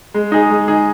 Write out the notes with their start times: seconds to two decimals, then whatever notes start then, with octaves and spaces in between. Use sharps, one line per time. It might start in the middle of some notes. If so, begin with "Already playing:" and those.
0.14 G#3
0.32 D#4 G#4
0.50 G#3
0.68 D#4 G#4